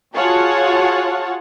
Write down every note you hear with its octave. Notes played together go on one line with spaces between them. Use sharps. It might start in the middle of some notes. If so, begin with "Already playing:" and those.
F4 F#4 G#4 C#5 F#5 A5